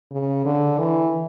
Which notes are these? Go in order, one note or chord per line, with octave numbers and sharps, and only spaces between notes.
C#3
D3
E3